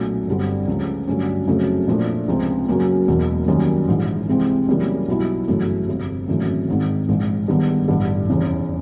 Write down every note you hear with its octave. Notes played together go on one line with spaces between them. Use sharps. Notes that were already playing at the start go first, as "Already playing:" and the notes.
Already playing: B1 A#2 F#3 A3 C#4
G1 G2 D3 G3 C4
C#2 C#3 F3 A3
G2 D3 F#3 A3 C#4
F#1 F2 C#3 F#3 A3
A#2 F3 A3 D4 F4
C#2 C3 F3 G#3 C4
F#2 C#3 F#3 A#3 C#4
E1 E2 B2 F#3 A#3
F#2 D#3 G3 A#3 C#4
A#1 G#2 E3
C2 C3 E3 G#3 C4
F#2 C#3 E3 G3 A#3
B1 B2 G3 B3 E4
G1 F#2 C#3 E3 A3
G1 F2 C3
G#1 F#2 C#3 E3 A3
G#1 G#2 D#3
A#1 G#2 E3 G#3
G1 G2 D#3 G#3 B3
A1 G2 D3
F1 E2 C#3 E3